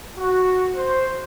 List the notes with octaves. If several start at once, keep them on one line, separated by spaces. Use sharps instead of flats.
F#4
C5